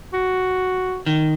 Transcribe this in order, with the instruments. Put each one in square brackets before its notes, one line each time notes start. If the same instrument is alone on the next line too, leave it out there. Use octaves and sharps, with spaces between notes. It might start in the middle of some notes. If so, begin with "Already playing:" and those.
[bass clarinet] F#4
[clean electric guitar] D#3